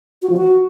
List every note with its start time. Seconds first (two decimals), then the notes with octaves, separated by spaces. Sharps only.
0.22 F#4
0.30 F3
0.37 F#4